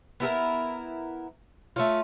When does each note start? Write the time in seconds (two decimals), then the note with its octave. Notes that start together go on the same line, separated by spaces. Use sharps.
0.20 B3 E4 A4 A#4
1.76 A3 C#4 F4